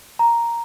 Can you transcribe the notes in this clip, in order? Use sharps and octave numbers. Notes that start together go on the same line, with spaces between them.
A#5